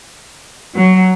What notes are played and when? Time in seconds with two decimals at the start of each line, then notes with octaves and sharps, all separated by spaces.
0.75 F#3